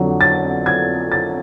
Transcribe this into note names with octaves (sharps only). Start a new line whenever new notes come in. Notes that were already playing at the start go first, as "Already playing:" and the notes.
Already playing: F2 D3 F#3
A6
G#6
A6